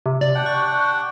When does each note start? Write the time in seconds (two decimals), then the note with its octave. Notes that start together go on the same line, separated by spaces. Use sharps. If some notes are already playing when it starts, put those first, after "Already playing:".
0.06 C3
0.21 D5
0.35 D4 F#5 G5
0.46 C#6